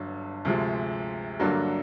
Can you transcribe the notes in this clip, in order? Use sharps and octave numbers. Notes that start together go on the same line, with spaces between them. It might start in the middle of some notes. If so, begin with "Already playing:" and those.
Already playing: G1 G2 D3 F#3
D2 C3 F3 G#3
G2 D3 F#3 A#3 D4